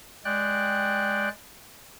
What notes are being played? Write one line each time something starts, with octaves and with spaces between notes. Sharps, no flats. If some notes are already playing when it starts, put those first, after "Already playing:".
G#3 D5 G5 F#6